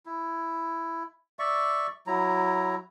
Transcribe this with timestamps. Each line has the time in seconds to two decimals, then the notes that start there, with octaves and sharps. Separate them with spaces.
0.06 E4
1.39 D5 E5 C#6
2.07 F#3 E4 A#5